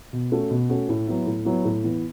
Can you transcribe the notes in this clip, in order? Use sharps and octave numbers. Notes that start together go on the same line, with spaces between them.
B2
A3 C#4 F#4
B2
A3 C#4 F#4
A2
F#3 B3 E4
A2
F#3 B3 E4
A2
E3 B3